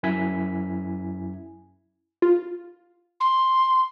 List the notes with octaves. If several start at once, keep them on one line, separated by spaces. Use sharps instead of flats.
F#2 E4 G#5 B6
F4
C6